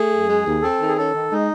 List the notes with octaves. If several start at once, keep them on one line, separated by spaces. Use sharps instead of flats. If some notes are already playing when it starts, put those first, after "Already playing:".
Already playing: A3 G#4
F#2
G#3
D#2
C4 A4
D#3
G#4
C#4 A4
D#3
G#3 D#4